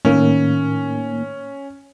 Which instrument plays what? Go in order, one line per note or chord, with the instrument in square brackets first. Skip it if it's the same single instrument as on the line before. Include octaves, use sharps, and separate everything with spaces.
[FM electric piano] A2 D#3 A#3 [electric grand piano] C#4